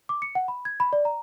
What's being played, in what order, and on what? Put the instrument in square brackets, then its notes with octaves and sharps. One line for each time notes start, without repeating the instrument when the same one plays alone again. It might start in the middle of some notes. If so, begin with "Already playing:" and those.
[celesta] D6
C#7
F#5
B5
G#6
B5
D5
A#5